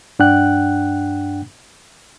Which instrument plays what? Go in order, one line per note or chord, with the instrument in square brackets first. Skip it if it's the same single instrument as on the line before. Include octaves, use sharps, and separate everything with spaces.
[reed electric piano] G2 D4 F#5 G5 F#6